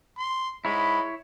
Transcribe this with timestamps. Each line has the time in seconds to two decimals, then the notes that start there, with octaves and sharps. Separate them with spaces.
0.18 C6
0.65 G#2 G#3 E4 C#5 B5